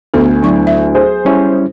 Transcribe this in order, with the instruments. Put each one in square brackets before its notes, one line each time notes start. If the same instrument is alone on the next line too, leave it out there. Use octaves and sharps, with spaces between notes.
[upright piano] D2 G#5 [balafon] B3 A4
[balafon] F#3 C#6 [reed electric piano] D4 E4
[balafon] E5
[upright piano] G#4 C5
[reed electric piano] G3 C#4 E4